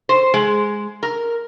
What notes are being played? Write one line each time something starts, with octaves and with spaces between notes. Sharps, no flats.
C5
G#3
A#4